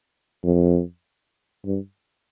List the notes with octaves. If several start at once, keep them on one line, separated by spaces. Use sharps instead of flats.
F2
G2